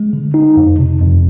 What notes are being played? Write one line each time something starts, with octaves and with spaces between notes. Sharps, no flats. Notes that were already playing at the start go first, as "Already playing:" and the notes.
Already playing: G#3
D3
D#4
F2
C3
F2